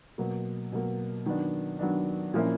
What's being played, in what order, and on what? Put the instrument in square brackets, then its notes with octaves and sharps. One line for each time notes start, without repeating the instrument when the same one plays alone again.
[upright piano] B2 F#3 A#3
B2 F#3 A#3
D#3 F#3 B3 D4
D#3 F#3 B3 D4
A#2 F3 A#3 C#4 E4